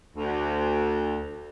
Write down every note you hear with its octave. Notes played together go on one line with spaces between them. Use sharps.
D2